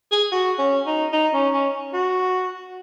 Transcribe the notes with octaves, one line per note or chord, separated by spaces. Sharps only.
G#4
F#4
C#4
D#4
D#4
C#4
C#4
F#4